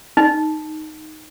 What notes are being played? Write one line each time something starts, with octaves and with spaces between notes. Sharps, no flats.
D#4